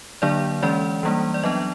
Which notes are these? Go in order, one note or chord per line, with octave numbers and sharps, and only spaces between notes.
D3 F#3 A#3 D4 D5
E3 G#3 C#4 D5
E3 G3 A#3 D4
D5
F#3 B3 D4 D#5